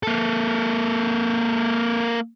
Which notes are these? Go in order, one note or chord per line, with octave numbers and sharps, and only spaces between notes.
A#3 A4